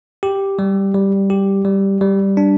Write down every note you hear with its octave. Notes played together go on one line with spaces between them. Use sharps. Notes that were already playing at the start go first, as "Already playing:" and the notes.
G4
G3
G3
G4
G3
G3
D4